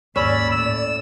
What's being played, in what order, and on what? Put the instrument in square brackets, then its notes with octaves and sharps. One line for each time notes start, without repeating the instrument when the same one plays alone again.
[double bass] D#2 G#2 [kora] C#4 [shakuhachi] D5 [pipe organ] B5 E6
[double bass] A2 [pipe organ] E6